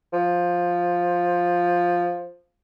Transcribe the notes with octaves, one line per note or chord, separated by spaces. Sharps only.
F3